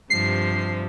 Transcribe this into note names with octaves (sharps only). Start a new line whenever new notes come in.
G2 C3 F3 C7